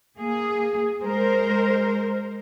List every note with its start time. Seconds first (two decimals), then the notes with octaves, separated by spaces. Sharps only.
0.17 A#3 G#4
1.02 G#3 A#4 C5